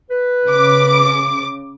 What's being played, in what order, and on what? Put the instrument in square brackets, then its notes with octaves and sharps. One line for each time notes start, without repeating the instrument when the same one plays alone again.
[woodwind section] B4
[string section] C#3 D6